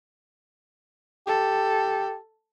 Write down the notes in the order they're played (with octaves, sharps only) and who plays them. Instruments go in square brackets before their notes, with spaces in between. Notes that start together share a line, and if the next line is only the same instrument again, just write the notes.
[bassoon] G4 [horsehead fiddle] A4